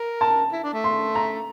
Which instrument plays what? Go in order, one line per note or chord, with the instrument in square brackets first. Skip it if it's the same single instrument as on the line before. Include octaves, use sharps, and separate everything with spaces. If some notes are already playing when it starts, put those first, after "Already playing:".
Already playing: [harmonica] A#4
[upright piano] A5
[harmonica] E4
D4
A3
[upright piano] C6
A#5